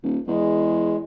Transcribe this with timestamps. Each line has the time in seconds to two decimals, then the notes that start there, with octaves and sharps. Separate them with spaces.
0.03 D#1
0.28 E2 G#3